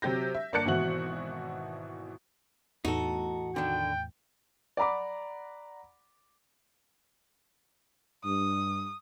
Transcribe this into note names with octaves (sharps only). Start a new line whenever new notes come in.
C3 F#3 G4 G6 A#6
E5
G1 A#3 D5 A5 F#6 C#7
G#1 B2 E3 E4 F#4 F#7
E2 A2 E3 D#4 F#4 A4
D3 D#3 G5
D5 F#5 A#5 B5 D6
G2 D#6